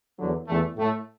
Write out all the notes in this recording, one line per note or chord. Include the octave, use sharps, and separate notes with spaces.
E2 D3 F#3
E2 E3 A3
A2 A3